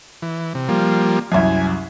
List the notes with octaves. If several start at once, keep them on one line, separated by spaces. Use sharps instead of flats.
E3
C3
F3 G3 A#3
C2 F#2 G#5